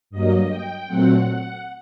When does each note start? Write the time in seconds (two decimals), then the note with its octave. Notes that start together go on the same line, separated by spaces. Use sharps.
0.10 G2 F#3 A#3 D#5
0.49 G5
0.87 A#2 F#3 A3 C4 F#5